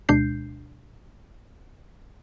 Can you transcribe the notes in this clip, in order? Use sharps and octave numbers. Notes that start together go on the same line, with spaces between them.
D2 B2 G#3 D4 G6 C7